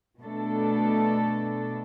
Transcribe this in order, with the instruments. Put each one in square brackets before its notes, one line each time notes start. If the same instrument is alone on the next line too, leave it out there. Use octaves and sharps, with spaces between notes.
[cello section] B2 A3 D4 A4